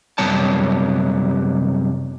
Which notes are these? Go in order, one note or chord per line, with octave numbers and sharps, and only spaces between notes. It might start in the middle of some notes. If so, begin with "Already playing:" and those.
F#2 C3 G3 B3 C#5 A5